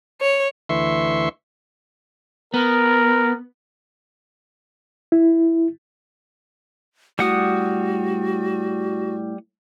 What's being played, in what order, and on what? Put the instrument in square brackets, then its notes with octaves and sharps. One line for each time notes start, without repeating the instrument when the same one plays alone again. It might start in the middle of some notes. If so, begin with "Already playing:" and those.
[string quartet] C#5
[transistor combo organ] D2 E3 E5 C6 C#6
[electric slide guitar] B3 [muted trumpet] A#4
[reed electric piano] E4
[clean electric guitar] A2 [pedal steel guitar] G3 F#5 D#6 [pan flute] F#4